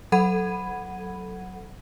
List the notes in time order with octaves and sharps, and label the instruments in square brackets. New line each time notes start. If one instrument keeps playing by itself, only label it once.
[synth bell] F#3 A4 F#5 B5 G#6 D#7